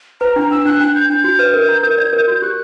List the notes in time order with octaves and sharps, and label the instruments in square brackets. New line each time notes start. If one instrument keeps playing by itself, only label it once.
[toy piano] B4 [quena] A#5
[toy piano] D4 [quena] A#5
[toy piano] D4 [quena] E6
[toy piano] D4 [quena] F#6
[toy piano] D4 [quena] F#6
[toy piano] D4 [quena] G6
[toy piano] D4 [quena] G6
[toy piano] F#4
B4
A#4
A#5
A#4
D5
A#4
F#4
[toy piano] G4 [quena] F#6